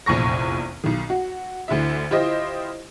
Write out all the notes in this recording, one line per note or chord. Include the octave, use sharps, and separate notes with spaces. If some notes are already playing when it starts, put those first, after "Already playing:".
F1 A#1 E2 C#6 A#6
B1 D#3
F#4
D2 D3 E4 E5
E4 F4 G4 C5 D#5